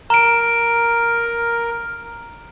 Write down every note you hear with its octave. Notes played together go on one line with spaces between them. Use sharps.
A#4 A#5 D7